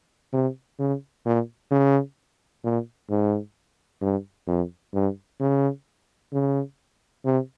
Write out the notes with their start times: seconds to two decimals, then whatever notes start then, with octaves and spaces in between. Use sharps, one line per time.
0.33 C3
0.79 C#3
1.25 A#2
1.71 C#3
2.64 A#2
3.10 G#2
4.02 G2
4.48 F2
4.94 G2
5.40 C#3
6.33 C#3
7.25 C3